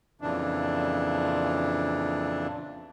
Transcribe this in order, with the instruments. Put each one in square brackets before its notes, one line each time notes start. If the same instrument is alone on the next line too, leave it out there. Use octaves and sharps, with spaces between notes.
[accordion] F2 A#2 C#3 E3 D4